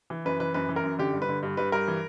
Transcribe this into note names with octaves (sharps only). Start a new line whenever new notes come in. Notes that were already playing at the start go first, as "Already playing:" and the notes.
E3
F#2 B4
E3 B4
F#2 B4
E3
A#4
F#2
D3 G4
G2
B4
D3
G2
G2 B4
G2 A#4
E3